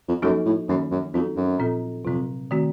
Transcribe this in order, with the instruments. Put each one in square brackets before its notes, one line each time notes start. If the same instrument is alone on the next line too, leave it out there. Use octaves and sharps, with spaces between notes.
[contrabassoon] F2
[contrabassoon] F#2 [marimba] F3 A#3 D#4 F#4 A4
[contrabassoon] A2
[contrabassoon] F#2 [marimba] D#3 A#3 C#4
[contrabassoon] F#2
[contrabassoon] F2 [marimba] F#3 C4 D#4 F#4 A4
[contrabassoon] F#2
[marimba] A#2 F3 C4 F4 A4
[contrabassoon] F2 [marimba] C3 F#3 C4
[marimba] D#3 A3 C4 F#4